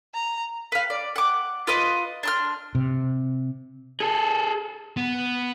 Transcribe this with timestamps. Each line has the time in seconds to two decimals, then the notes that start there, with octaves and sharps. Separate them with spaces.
0.14 A#5
0.72 B4 F5
0.90 D5
1.16 F#5 D6
1.67 F4 B4 D#5 D6
2.23 D4 C6 F6
2.75 C3
4.00 G#4 A4
4.97 B3